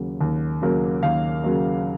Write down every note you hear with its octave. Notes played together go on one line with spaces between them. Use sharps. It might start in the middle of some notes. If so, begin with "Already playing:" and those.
Already playing: D#2 C#3 F#3 A#3
D#2
C#3 F#3 A#3
D#2 F5
C#3 F#3 A#3